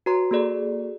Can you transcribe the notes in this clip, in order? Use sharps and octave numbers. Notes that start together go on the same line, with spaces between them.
F#4 B4 C#5 A#5 C6
A#3 F#4 G#4 A4 D5